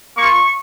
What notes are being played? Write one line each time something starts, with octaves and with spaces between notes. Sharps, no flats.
A#3 F4 C#6